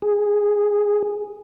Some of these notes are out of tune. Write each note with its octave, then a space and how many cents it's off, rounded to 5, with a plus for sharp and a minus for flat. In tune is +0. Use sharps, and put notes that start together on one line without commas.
G#4 -5